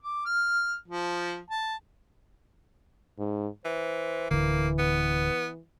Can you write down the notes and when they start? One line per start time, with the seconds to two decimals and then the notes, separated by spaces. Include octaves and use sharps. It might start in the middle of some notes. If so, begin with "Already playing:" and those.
0.03 D6
0.26 F6
0.88 F3
1.50 A5
3.19 G#2
3.65 E3 C5
4.31 D1 B1 D3 E3 A#3
4.79 B3